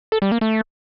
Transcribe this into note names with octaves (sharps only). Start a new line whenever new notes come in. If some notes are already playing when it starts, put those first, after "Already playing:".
A4
G3
A#3
A3